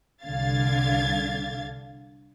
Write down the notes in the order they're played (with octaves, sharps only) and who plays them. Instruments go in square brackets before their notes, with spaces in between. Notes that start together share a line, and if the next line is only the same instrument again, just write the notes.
[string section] C2 D3 F5 G#6 A6